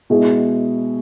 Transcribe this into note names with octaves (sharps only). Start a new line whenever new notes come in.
B2 G#3 E4 G#4